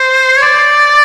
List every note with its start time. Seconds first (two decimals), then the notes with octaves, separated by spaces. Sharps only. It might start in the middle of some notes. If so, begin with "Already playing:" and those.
Already playing: C5
0.37 C#5
0.42 D5